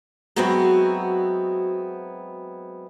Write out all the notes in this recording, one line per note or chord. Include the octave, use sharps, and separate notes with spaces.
F#3 G#3 B3 C4 E4 F#4